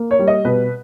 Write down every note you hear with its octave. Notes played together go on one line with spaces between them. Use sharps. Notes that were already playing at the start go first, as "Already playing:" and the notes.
Already playing: A#3
C#5
G3
D#5
B2 B4